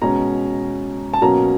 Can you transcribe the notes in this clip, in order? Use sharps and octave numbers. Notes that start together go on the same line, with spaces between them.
B2 G#3 C#4 A#5
A5
B2 F#3 A#3 C#4 A#5